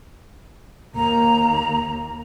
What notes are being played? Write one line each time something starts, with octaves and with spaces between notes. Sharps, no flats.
D#2 A#3 A#5